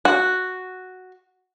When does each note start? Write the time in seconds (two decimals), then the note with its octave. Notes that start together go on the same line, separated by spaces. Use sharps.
0.05 F#4